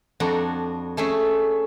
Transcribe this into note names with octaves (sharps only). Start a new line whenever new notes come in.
F2 D4 F#4 A#5
A3 C#4 G#4 E5